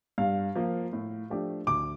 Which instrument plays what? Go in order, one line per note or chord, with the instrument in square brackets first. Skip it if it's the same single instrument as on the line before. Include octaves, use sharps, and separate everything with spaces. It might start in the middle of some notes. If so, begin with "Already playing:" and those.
[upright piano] G2 [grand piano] F5
[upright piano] F3 A#3
A2
F3 A3 D4 G4
[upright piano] D2 [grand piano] D6